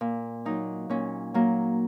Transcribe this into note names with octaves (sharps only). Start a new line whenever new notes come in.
A#2
F#3 A#3 D#4
A#2 C#4
F#3 A#3